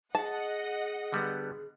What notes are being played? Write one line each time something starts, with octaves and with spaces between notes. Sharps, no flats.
G#4 D#5 F#5 A5
D3 G3 B3